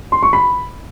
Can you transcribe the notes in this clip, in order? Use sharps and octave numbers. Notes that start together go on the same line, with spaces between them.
C6
C#6
B5